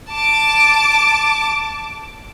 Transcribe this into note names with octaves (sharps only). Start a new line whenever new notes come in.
A5 D6